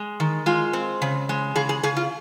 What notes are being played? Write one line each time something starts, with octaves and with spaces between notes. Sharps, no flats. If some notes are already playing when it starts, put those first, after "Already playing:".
Already playing: G#3
D#3
G#3 F4
C4
C#3
G#3
C#3 G#4
G#4
C#3 G#4
F4